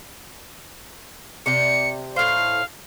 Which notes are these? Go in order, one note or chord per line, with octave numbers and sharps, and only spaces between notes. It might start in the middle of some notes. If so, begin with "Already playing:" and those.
C3 D5 G5 C#7
A2 C5 F5